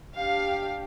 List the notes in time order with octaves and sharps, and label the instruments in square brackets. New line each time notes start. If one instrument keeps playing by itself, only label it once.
[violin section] D4 G4 F5